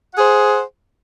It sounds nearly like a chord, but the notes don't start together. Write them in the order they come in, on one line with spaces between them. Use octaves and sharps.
F#5 G#4 C5